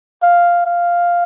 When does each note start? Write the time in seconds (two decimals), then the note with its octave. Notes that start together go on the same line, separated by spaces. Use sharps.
0.23 F5
0.66 F5